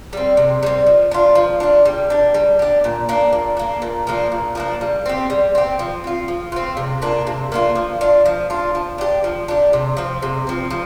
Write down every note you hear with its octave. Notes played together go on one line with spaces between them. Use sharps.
G3 C4
C3
G3 C4
F3
D4 F4
F3
D4 F4
G3
D4 G4
G3
D4 G4
A#2
A#3 D4
A#2
A#3 D4
A#2
F3 A#3 D4
A#2
F3 A#3 D4
G3
C4 G4
G3
C4 G4
F3
C4 F4
F3
C4 F4
C3
A#3 D4 F4
C3
A#3 D4 F4
F3
D4 F4
F3
D4 F4
F3
D4 G4
F3
D4 G4
C3
F3 C4
C3
F3 C4
F3